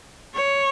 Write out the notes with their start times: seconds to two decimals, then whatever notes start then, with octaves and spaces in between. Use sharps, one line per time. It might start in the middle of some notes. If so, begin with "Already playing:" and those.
0.34 C#5